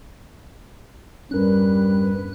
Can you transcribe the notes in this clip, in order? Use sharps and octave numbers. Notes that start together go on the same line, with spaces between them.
E2 G2 G3 C#4 A#4 B4 F#6